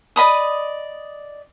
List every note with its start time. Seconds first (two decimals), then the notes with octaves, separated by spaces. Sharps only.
0.16 D5 D#5 B5 D#6